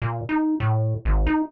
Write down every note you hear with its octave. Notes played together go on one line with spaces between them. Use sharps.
A#2
D#4
A2
G#1
D#4